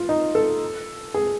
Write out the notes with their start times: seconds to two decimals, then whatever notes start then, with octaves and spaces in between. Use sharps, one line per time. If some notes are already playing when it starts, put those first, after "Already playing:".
Already playing: F4
0.09 D#4
0.35 A4
1.14 G#4